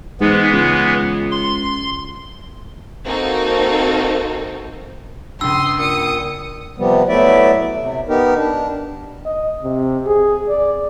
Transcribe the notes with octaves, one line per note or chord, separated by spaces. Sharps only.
G#2 E3 G#3 B3
C#2
C6
A#3 C4 D#4 F#4 A4 A#4
C#2 G2 C6 D#6 E6
A#2 D#6 C#7
C3 F3 G3 B3
F#3 A3 B3 E4 D5 E5
C3
B3 D#4 G4 A#4
D4
D#5
C3
G#4
D5